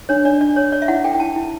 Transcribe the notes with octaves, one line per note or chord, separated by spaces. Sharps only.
D4 C#5
D4 D5
D4 D5
C#5
C#5 D5
E5
E4 F#5
A4 G5
G5
E4 A5
E4